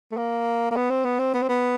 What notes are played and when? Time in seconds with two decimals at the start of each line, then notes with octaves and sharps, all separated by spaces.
0.12 A3
0.17 A#3
0.71 A#3
0.76 B3
0.90 C4
1.05 B3
1.19 C4
1.34 B3
1.42 C4
1.49 B3